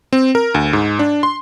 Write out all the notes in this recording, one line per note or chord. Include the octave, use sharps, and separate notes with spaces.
C4
A#4
D2
G#2
D4
C6